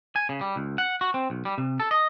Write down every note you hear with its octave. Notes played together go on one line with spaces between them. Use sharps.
G#5
C#3
G3
C#2
F#5
F#4
C4
B1
G3
C3
A4
D#5